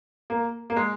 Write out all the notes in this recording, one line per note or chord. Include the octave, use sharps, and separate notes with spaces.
A#3
A#3
G#3